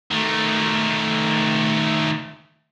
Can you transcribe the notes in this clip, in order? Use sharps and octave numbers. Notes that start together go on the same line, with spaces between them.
D#3 A3